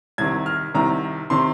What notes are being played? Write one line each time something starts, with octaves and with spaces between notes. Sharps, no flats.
C2 C3 D#3 G#6
F6
C2 C3 D#3 A#5
C3 D#3 C6